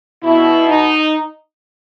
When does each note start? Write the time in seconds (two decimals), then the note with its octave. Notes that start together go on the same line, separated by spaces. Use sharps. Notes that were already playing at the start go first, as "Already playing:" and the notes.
0.23 B2 E4
0.68 D#4